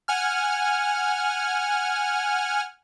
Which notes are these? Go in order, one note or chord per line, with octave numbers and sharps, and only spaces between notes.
F#5 G#5 F6